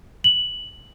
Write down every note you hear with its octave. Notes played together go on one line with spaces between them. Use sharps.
F#7